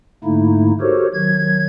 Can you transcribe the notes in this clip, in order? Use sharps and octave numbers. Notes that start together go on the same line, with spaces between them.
G#2 D3 A3 A#3 D#4 E4
F#4 G4 A4 A#4 C5 C#5
D#3 F#3 G#6